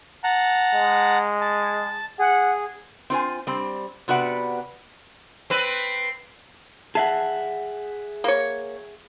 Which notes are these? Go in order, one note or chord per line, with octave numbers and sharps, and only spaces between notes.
F#5 A5 A#5
G#3
A5
G#4 F#5
C4 F4 C5 G#5
G3 C4
C3 B3 F#4 B4 D5 F#5
C4 B4
G#4 E5 F#5 A5
A#3 C#5